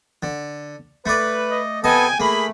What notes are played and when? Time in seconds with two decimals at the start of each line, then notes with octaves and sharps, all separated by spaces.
0.23 D3
1.06 A3 B4 D5
1.50 D#5
1.84 C3 B3 A4 D#5 G5 G#5
2.20 A3 A#3 G#4 B5